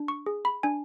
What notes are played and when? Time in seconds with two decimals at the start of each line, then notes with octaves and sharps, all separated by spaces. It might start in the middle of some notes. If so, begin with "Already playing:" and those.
Already playing: D4
0.08 C#6
0.26 G#4
0.45 B5
0.63 D4 G#5